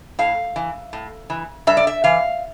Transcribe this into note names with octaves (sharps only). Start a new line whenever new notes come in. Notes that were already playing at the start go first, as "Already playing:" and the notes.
A2 F5
E3
A2
E3
G2 E5
D5
E5
E3 F5